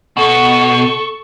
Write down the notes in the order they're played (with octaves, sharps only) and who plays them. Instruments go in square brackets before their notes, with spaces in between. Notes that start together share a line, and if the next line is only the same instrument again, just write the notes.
[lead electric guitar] B2 [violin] A4 C#6